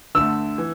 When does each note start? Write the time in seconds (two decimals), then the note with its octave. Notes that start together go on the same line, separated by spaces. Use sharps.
0.15 D2 D3 A3 E6
0.58 E3